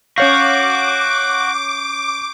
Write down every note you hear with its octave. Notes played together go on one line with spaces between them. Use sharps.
C#4 F#4 C#5 F5 C#6 D6 G6 C7